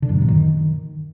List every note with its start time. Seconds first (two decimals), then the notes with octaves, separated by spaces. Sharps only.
0.02 D3
0.09 F#2
0.15 A#2
0.22 F#2
0.28 D#3